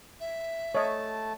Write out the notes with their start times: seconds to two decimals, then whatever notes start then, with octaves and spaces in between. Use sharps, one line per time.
0.20 E5
0.75 A3 C#5 D#5 A5